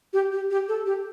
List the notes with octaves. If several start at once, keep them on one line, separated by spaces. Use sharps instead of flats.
G4
G4
G4
A4
G4